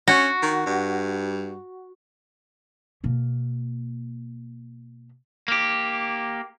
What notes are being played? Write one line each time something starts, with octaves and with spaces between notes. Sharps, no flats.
C#4 F#4
D#3
G2
B2 A#3
A#3 G4